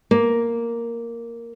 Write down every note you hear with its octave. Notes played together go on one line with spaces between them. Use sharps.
A#3